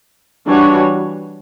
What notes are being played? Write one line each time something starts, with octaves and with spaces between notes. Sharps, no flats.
E3 G3 D4 F#4 C#5